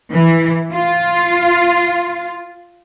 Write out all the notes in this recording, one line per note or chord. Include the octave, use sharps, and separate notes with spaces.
E3
F4